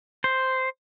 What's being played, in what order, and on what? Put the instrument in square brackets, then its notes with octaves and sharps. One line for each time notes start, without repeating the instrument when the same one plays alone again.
[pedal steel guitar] C5